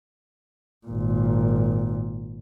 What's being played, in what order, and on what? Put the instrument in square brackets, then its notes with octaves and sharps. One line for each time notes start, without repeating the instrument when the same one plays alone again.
[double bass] G#1 A#2